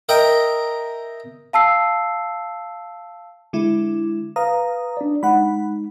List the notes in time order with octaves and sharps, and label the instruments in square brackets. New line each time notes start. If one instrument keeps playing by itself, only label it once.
[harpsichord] A#4 D#5 E5 G5 A#5
[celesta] F5 A5 E6 C7
[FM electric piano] D3 G#3 E4
[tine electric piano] B4 [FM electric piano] F5 A#5 D#6
[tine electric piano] D4 D5
[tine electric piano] G#3 D#4 [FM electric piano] F#5 B5